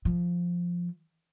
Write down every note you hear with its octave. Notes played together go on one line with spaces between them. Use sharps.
F3